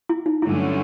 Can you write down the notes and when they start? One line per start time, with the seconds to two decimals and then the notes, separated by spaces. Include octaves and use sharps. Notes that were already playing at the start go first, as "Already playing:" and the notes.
0.09 E4
0.26 D#4
0.42 G2 D3 F#3 A3 C#4 E4